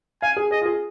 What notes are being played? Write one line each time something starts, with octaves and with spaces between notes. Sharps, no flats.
F5 G#5
G#4
G#4 D#5
F4
G#4